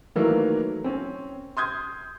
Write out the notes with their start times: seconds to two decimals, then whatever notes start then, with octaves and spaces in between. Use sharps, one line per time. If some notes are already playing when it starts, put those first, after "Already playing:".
0.16 D#3 E3 F#3 A3 A#3
0.84 C4 C#4
1.57 C6 D#6 G6 G#6